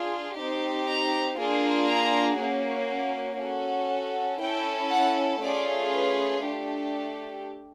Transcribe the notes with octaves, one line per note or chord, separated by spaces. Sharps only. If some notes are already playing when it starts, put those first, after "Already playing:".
Already playing: D4 F4 G#4
C4 D#4 G4
A#5
A#3 D4 F4 G#4
A#5
A#3 C#4 F#4
C#4 F#4 A4
C#4 E4 A4 G5
F#5
A3 C#4 F4 G#4 D5
B4
A3 D4 G4